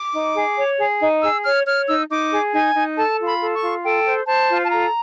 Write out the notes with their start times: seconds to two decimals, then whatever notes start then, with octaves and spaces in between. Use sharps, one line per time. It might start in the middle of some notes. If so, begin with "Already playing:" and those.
Already playing: D6
0.14 D#4
0.35 G#4
0.57 C#5
0.79 G#4
1.01 D#4
1.22 G#4 E6
1.44 C#5 F6
1.66 C#5 F6
1.87 D#4 E6
2.10 D#4 D6
2.31 G#4
2.52 D#4 G#5
2.75 D#4
2.96 A4 A5
3.19 F4
3.26 B5
3.40 A4
3.55 C#6
3.62 F4
3.83 A4 G5
4.06 C5
4.27 C5 A5
4.49 F4
4.64 A5
4.70 A4 A#5